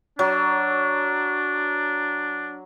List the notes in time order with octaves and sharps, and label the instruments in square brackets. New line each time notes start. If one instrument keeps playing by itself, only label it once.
[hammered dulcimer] F#3 [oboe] D4